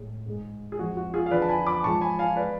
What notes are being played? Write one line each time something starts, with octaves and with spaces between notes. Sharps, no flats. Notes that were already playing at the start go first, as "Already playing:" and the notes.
Already playing: A2 G#3
G#2 G#3
G#4
F2 F3 G#3 F#4
F#4
F4 G#4
F5
F2 D3 F3 B4 D5
A5
G#5 B5
B5 D6
G#2 F3 G#3 A5 C#6
G#5 B5
F5 G#5
G#3 B4 D5